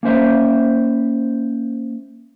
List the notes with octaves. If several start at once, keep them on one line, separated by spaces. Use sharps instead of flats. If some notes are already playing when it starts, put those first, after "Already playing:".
A#3 C#4 C5 E5